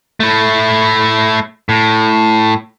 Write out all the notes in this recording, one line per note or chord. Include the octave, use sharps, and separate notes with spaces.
A3 E4
A2